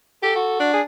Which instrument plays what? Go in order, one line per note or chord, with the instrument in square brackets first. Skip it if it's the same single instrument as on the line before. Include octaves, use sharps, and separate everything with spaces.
[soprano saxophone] G4 [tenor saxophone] A4
[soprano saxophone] F#4
[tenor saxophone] D4
[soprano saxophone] G#4